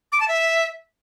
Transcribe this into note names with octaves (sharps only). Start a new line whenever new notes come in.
D6
A5
E5